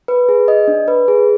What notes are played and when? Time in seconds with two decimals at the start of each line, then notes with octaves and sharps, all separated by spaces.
0.08 B4
0.29 G#4
0.48 D#5
0.68 D4
0.88 B4
1.08 G#4